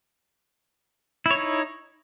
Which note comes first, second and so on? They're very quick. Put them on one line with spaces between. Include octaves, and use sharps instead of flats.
E4 C#5 D#4